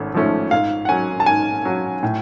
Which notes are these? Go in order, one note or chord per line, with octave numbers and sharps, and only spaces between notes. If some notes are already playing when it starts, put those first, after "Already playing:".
Already playing: G#1 A3 C#4
G#2 F3 A3 C#4
G#2 F5
F#5
F#3 C#4 G#5
A5
G#2 G#5
F#3 C#4
A2